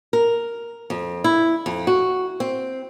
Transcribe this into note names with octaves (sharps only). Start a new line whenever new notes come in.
A#4
F2
E4
F2
F#4
C4